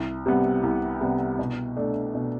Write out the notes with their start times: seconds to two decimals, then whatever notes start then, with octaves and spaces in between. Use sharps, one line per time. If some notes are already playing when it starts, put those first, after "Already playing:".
Already playing: C2
0.26 C3 G3 B3
0.63 C2
1.01 C3 G3 B3
1.39 B2
1.77 A3 D4
2.15 B2